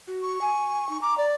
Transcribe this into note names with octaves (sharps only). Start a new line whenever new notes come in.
F#4
C#6
G#5
D#4
A#5 D6
D5